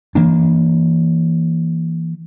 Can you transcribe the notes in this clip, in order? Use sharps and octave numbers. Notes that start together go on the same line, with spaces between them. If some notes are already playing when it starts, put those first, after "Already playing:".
E3 A#3 D4